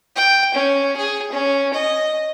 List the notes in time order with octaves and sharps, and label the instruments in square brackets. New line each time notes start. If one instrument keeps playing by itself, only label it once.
[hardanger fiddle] G5
C#4
G#4
C#4
D#5